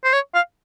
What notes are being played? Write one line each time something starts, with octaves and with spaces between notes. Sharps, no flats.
C5
C#5
F5